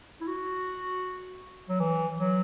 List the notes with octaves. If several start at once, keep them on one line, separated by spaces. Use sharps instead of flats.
E4
F#4
F#3
E3
F#3